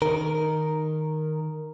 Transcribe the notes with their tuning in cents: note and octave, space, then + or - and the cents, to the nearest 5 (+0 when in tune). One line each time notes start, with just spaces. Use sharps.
D#3 +0 A#4 +0